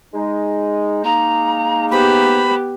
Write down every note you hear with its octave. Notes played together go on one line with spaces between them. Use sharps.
G#3 D#4
G#3 A#3 D#4 A#5
B3 G4 C5 B5